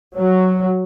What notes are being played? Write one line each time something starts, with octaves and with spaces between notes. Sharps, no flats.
F#3